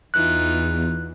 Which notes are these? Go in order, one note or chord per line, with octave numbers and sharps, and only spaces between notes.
E2 E3 D#4 F4 F#6